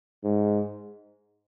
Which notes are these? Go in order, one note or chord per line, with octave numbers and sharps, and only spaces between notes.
G#2